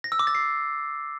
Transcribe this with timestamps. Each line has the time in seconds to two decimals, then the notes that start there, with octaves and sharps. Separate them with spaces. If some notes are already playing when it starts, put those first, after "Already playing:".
0.04 A#6
0.12 E6
0.19 D6
0.27 A6
0.35 C7